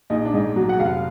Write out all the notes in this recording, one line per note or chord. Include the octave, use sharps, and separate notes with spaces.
A#1 D#4
D4
G#2 D#4
F#3 F#4
F#5
F1 F5